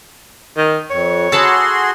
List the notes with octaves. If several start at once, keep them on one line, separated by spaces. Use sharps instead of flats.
D#3
F2 C#5
F#4 G#4 A4 A5 B5 C6